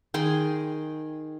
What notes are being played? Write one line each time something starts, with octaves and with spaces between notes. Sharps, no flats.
D#3 G#4 G5 C6